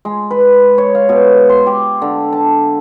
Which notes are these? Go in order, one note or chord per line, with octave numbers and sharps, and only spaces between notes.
G#3
B4
C#5
F5
B2
C6
G4
D3
A5